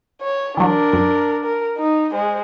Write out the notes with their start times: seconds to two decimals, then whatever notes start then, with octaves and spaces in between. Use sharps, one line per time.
0.22 C#5
0.57 E3 F#3 D4 A#4
0.93 F#2
1.44 A#4
1.78 D#4
2.12 G#3 C5